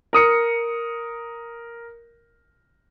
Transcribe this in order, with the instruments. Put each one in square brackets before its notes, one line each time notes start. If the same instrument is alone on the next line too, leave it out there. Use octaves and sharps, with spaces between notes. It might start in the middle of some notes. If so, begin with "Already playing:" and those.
[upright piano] A#4 D#6 C#7